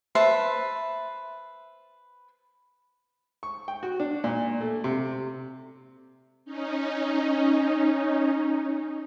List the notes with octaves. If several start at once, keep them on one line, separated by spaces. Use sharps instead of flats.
B4 C5 E5 A5
C#6
G5
F#4
D4
A#2
A3
C3
C#4 D#4